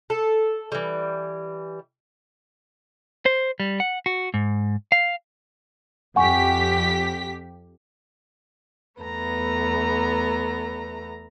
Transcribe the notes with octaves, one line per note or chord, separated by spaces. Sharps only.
A4
E3 G3
C5
G3
F#5
F#4
G#2
F5
F2 G4 F#5 G#5 C#6 B6
E2 A3 B3 A#5